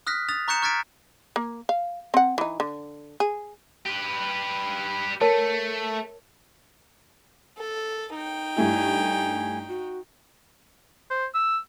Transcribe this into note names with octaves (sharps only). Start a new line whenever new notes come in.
D#6 F6 F#6 A#6 B6
D#6 A6 F7
A#5 C#6 F#6 G6 C#7 E7
C#6 F6 G#6 A6 B6 D7
A#3
F5
C4 F#5
E3 D#4
D3
G#4
G4 B4
A3 A#4 C#5 A5
A4
D#4 G5
G2 A3 E4 G#5
F#4
C5
E6